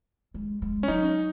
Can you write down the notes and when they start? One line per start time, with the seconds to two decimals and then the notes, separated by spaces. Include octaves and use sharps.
0.34 G#3
0.62 G#3
0.83 C#4
0.88 F#3 D#4